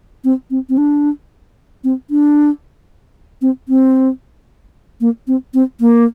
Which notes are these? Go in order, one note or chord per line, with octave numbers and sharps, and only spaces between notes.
C4
C4
C4
D4
C4
D4
C4
C4
A#3
C4
C4
A#3